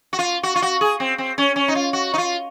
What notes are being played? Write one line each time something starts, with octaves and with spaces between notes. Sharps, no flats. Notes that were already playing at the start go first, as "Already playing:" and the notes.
F#4
F4
F#4
F4
F#4
G#4
C4
C4
C#4
C#4
D#4
F4
F#4
D#4
F4